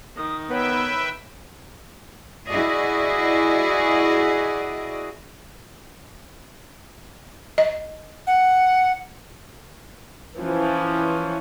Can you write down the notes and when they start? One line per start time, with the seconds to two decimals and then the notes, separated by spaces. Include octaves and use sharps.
0.17 D#3 D#6
0.50 B3 B4 C#5 E5 G5
2.48 E4 F#4 G#4 D5 D#5
7.58 D#5
8.27 F#5
10.38 E3 F3 C#4